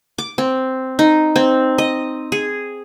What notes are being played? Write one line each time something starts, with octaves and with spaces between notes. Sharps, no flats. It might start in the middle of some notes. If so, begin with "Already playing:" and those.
D6
C4
D#4
C4
D#5
G#4